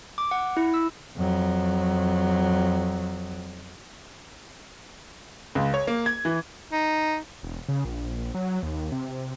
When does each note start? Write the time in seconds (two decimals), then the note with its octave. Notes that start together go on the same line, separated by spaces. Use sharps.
0.18 D6
0.31 F#5
0.57 E4
0.74 E6
1.16 F2 F#3
5.55 C#2
5.74 C#5
5.87 A#3
6.06 G#6
6.25 E3
6.72 D#4
7.43 E1
7.69 C#3
7.85 A#1
8.35 F#3
8.63 D#2
8.92 C3